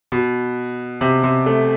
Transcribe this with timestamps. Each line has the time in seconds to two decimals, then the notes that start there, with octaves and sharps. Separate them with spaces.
0.12 B2
1.01 C3
1.23 C3
1.46 A3